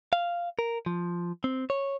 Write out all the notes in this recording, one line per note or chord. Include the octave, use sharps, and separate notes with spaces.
F5
A#4
F3
C4
C#5